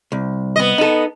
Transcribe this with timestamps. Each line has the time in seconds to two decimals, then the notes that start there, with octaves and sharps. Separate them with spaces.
0.12 C2
0.56 B3 D#5
0.78 D#4 A4